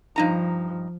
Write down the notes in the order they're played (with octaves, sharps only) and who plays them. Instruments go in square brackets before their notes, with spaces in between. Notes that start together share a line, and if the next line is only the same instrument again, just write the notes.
[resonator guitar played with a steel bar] G2 D#4 A#5 [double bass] F3